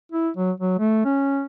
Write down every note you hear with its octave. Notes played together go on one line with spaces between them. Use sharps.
E4
F#3
F#3
A3
C#4